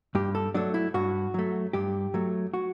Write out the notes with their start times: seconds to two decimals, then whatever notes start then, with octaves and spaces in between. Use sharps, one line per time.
0.15 G2 G4
0.35 A4
0.54 F#3 A3 D4
0.74 E4
0.94 G2 F#4
1.34 F#3 A3
1.73 G2 G4
2.14 F#3 A3
2.54 F#4